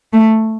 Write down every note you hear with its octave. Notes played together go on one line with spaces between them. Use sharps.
A3